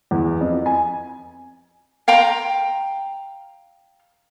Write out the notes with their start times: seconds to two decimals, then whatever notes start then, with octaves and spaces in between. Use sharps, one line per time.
0.11 E2
0.41 F2
0.66 G#5
2.08 F5 G5 A#5 C6